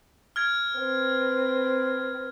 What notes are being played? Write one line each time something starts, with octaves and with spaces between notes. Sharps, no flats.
F6 G#6
C4 B4